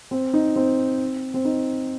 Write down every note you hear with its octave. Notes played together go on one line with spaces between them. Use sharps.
C4
D#4
C4
C4
D#4